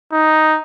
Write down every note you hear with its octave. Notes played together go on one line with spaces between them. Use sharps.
D#4